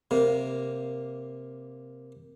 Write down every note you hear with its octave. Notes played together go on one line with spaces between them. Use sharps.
C3 A#3